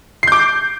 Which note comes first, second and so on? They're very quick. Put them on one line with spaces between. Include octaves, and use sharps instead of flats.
C7 G6 D6